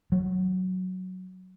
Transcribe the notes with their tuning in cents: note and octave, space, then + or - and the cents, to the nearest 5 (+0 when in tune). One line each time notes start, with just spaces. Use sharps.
F#3 +0